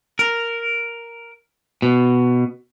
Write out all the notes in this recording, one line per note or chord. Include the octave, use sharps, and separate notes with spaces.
A#4
B2